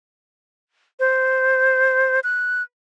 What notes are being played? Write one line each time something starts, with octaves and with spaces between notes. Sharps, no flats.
C5
F#6